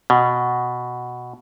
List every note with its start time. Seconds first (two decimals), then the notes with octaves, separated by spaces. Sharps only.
0.10 B2